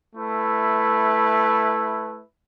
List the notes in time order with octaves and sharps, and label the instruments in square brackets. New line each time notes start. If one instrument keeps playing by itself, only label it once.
[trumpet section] A3 E4 B4